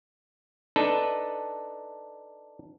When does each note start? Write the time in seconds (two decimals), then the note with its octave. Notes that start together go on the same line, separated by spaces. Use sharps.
0.76 D4 D#4 A4 B4